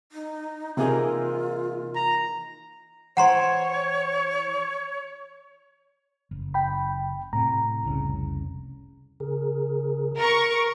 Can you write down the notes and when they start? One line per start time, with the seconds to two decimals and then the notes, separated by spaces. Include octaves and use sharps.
0.12 D#4
0.77 C3 E3 A#3 D#4 F4 G#4 A#4
1.95 A#5
3.17 E3 C5 C#5 F#5 G5 A#5 C6
6.31 F#1
6.54 G5 B5
7.33 A2 C3 A#5
7.83 F1 C2 C#3
9.20 C#3 G#4 A#4
10.17 A#4 C#6